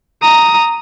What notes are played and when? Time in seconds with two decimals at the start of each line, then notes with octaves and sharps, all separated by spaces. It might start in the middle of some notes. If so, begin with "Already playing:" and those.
0.22 A#5 D#6